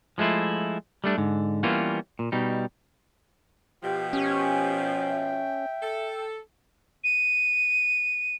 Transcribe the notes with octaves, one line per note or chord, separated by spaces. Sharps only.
F3 G#3 A3 E4 F4
G3 A3 D4
G#2 D3
E3 G3 A#3 B3 C#4 F4
A#2
B2 G3 D#4
B2 F3 G4 G5
C#4 G4
E5
A4
D#7